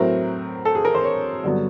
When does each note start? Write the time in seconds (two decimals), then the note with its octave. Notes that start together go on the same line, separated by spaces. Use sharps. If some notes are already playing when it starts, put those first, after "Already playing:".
Already playing: A2 F#3 A3 C4 A#4
0.65 A4
0.75 G#4
0.85 A#4
0.95 C5
1.04 C#5
1.44 G2 D3 F#3 B3